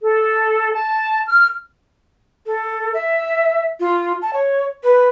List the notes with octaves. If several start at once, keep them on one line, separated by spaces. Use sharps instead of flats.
A4
A5
F6
A4
E5
F4
A5
C#5
B4